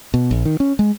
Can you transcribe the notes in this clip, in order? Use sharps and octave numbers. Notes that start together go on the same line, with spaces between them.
B2
A#1
D#3
C#4
G#3